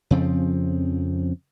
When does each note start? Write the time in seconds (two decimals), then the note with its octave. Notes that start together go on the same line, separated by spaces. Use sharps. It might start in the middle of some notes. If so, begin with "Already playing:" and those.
0.11 F2 C#3 F3 C4